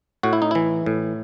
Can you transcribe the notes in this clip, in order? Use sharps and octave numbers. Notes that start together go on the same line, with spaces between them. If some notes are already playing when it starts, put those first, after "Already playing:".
A2 F#4
E4
D#4
E3 E4
A2